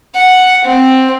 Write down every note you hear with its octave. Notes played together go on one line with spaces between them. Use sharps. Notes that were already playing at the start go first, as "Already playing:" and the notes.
F#5
C4